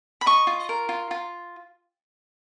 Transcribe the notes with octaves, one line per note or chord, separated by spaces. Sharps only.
B5
D#5 C#6
F4
A#4
F4
F4